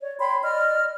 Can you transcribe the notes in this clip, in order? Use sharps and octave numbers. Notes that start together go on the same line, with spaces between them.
C#5 D5
C#5 G5 B5 C6
D5 D#5 F6